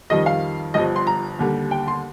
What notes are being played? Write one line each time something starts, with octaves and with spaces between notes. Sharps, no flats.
F2 D#3 G3 D#5
F5
G1 G2 F3 D#5
C6
A#5
D#2 D3 G3
G5
C6